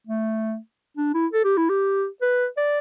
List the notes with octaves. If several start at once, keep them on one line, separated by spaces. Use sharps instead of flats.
A3
D4
E4
A4
G4
E4
G4
B4
D5